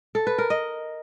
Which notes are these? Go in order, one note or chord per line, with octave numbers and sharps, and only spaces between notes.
A4
B4
A#4
D#5